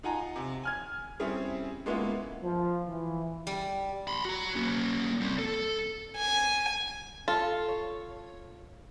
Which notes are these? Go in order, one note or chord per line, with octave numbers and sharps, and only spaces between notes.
D#4 F4 F#5 G#5 A#5
C3
G#5 F6 G#6
G3 C4 C#4 E4 G#4
G#3 A#3 B3 C#4 E4 F4
F3
E3
G3
B5 C6
F#4 A#5
A#3 C#4
G3 C4
A4
G#5
F4 A4
C#5